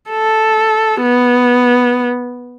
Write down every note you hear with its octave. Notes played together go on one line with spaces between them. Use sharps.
A4
B3